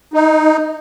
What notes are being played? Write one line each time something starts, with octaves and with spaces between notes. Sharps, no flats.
D#4